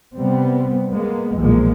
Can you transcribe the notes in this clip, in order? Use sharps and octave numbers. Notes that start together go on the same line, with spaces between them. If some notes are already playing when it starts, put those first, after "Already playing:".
C3 G3 B3 C4
G#3 A#3 B3
B1 E2 A#2 F3 G#3 A#3